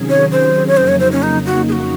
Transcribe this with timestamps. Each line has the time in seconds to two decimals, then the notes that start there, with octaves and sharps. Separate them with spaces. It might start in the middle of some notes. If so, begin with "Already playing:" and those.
Already playing: C3 D#3 F#3 C#4 G#4
0.09 C#5
0.32 C5
0.68 C#5
0.77 F2 C#3 F#3 A#3 D#4 C5
0.88 C#5
1.00 C5
1.12 C#4
1.23 D#4
1.46 F#4
1.69 G#4
1.72 F#4